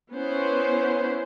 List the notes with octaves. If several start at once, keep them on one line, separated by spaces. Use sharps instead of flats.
B3 C#4 E4 C5